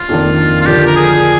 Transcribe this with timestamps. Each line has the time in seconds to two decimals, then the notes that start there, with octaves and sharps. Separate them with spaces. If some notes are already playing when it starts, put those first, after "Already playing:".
Already playing: F4
0.09 F2 D#3 A#3 D4
0.61 F4
0.66 D3 F3 A#3 D4 G4
0.87 A#4
0.96 G#4